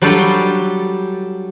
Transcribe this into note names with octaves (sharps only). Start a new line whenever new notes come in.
F#3 G3 D4 F4 G4 A4